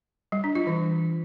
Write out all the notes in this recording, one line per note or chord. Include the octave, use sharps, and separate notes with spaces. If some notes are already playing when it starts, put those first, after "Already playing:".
G3
D4
F4
E3